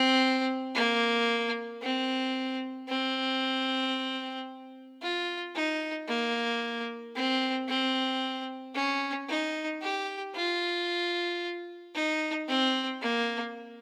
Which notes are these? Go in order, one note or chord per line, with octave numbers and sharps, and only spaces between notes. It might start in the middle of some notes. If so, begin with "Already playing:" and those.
Already playing: C4
A#3
C4
C4
F4
D#4
A#3
C4
C4
C#4
D#4
G4
F4
D#4
C4
A#3